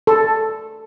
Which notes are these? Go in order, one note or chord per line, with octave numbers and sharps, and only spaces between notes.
A4